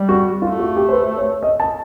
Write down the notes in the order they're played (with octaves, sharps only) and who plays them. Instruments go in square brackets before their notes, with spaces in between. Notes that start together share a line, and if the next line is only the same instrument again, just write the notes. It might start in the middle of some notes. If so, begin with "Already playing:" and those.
Already playing: [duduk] G3
[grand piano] F#4
[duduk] A3 [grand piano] F4
[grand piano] F#4
G4
C5
B4
C#5
D#5
A5